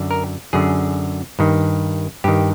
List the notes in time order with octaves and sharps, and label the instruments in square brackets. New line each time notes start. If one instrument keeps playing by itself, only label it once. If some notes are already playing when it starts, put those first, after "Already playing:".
Already playing: [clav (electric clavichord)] F#2 D3
A#4
F#2 D3 G#4
G2 D#3
G2 D#3 G4